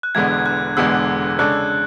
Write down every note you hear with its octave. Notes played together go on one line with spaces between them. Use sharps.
F#6
E1 E2 D3 G#3 B3 G#6
G#6
F#6
E1 E2 D3 G#3 B3 E6
C#3 G#3 D4 A4 D5 F#6